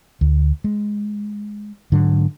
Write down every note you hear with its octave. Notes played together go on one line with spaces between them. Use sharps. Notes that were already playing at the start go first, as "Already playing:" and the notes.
D2
G#3
G#2 D3 F#3